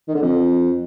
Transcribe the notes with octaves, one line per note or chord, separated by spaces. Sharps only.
D#3
D3
F2